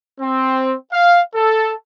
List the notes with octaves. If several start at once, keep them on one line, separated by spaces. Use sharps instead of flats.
C4
F5
A4